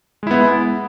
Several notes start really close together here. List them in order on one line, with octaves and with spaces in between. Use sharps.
G#3 E4 B3